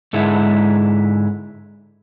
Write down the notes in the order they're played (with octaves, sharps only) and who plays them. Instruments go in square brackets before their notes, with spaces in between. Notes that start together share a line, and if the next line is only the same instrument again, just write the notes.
[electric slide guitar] G#2 D3 G#3 E4